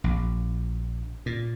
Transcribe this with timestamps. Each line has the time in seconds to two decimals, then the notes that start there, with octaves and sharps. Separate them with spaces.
0.04 A#1
1.26 A#2